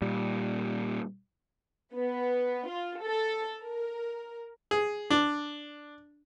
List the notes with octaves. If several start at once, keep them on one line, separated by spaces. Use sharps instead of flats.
A#2 G3
B3
F4
A4
A#4
G#4
D4